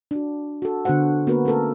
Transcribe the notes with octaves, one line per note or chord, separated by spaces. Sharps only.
D4 F#4
F#4 A4
D3 B3 F#4 C5 F#5
A#3 B3 F#4 A#4 B4
A3 C#4 A4 A#4